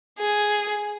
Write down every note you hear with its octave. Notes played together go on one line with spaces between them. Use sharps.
G#4